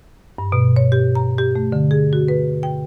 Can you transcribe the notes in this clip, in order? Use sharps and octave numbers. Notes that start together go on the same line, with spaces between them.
G2
B2
C#5
G4
A#5
G4
A3
D3
G#4
F#4
B4
G5